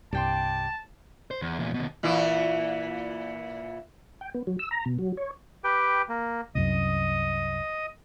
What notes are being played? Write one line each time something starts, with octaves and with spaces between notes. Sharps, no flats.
C2 G2 D5 G5 A5 C6
C5
E2
E2 A#2
D#2 B2
A#2 E3 E4
G5
B3
F#3
E6
A#5
B2
F#3
C#5
G4 B4 G5
A#3
C2 F#2 D#5 D#6